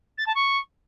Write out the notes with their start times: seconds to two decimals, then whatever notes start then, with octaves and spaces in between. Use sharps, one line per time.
0.17 A6
0.26 A5
0.35 C#6